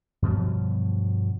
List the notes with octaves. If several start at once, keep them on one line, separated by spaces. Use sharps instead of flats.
G2 B2 F3 F#3